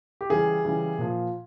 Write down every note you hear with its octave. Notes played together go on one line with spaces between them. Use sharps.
G4
C#3 E3 G3 G#4
C#3 E3 G3
A#2 F3